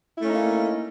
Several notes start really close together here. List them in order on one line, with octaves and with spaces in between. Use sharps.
E4 A3 C#4 D#4 A#3